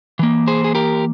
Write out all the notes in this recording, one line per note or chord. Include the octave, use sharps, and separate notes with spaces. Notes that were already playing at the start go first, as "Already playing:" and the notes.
E3 A#3
G#4 C5
G#4
G4 A#4